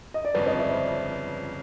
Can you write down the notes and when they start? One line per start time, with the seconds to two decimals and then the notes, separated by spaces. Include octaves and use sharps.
0.14 D#5
0.25 D5
0.34 G1 F2 C#3 F3 B4 C#5
0.47 C#5 D#5
0.59 D5 E5
0.71 C5 D5